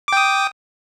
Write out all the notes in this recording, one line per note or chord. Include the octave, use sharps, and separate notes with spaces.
G5 D6 D#6